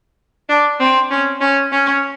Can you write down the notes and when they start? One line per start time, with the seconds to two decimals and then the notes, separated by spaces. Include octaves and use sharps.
0.49 D4
0.80 C4
1.11 C#4
1.41 C#4
1.72 C#4